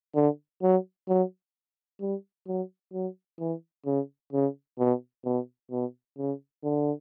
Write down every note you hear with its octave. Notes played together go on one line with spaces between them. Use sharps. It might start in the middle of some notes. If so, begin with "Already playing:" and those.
D3
F#3
F#3
G3
F#3
F#3
E3
C#3
C#3
B2
B2
B2
C#3
D3